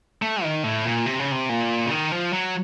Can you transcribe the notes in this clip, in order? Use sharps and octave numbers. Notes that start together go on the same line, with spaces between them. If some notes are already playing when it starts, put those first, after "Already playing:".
A3
D#3
A2
A#2
C3
C#3
C3
A#2
C#3
D#3
F3
F#3